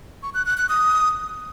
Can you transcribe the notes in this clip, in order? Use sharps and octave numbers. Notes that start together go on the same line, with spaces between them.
C#6
F#6
F#6
F#6
D#6